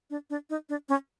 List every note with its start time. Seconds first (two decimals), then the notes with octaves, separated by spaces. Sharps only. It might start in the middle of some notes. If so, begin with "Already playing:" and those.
0.10 D4
0.30 D4
0.50 D#4
0.69 D4
0.89 C#4